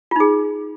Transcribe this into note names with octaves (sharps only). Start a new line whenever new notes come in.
D#4 F4 G#4